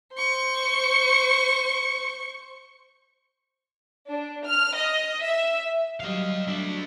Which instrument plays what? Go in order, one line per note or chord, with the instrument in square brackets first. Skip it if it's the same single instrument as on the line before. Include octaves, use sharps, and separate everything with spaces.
[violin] C5 C#6
[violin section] D4
F6
D#5
E5
[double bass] F#3 G3 [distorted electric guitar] D#5 F5
[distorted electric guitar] D4 E5